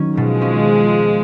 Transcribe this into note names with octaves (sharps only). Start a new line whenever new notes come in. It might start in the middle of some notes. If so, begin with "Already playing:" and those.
Already playing: D#3 F#3 C#4
B2 F3 G#3
C#4